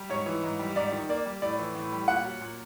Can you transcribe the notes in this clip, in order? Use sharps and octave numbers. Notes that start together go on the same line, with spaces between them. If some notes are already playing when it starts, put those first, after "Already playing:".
Already playing: G3
G#2 C#5
E3
G#2
G3
G#2 D5
D#3
A#3 D5
G3
A2 D5
E3
A2
G3
A#2 F#5
F#3
A#2